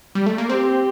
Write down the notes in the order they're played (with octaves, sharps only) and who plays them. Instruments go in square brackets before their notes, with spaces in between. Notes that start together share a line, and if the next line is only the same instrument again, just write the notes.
[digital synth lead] G3
A3
A#3
[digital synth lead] C4 [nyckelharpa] G4